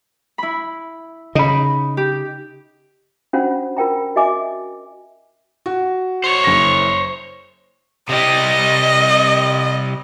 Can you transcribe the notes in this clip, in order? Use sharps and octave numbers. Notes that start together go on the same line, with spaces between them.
E4 B5
C#3 D#4 D#5 B5
G4
C#4 D4 F4 F#4 C5 F#5
F4 A#4 G5 A#5
F#4 D#5 E5 G#5 D6
F#4
C5 C#5
F#1 A#6
C3 G3 D#5